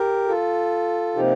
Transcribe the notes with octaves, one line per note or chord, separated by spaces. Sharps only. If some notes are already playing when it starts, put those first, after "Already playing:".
Already playing: G4 A#4
F4 A4
C3 F3 A#3 D#4 G4